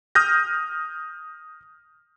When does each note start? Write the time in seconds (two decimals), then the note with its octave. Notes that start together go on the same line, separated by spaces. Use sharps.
0.15 D#6 F6 G6 A#6